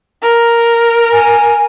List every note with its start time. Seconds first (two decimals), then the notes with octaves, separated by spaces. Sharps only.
0.22 A#4
1.12 G#5